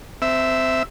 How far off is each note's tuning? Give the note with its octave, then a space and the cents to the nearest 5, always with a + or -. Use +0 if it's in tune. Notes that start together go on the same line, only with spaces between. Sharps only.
C4 -20 E5 +0